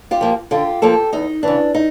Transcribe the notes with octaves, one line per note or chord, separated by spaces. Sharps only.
F4 G4
F3 A#3
D3 F4 G4
F3 A#3 G4 A4
E2 D#4
C#3 E3 D4
D#4